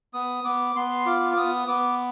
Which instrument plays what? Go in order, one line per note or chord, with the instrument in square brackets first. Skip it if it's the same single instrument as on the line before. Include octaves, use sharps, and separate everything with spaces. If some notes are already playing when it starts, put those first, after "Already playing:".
[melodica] B3 D#6
B3 D6
B3 C6
F4 D6
D6
B3 D#6
B3 D6